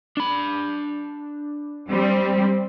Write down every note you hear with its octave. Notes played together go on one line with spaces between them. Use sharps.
D4 B5
G3 C4